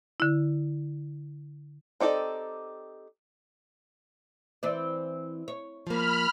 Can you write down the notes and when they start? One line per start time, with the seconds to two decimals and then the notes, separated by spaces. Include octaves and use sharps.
0.20 D3 E4
2.00 C4 D#4 G4 A4 D5
4.63 E3 C4 D5
5.48 C#5
5.87 F3 A#3 B5 F6